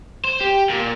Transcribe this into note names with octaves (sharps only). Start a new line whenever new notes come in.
C5
G4
A#2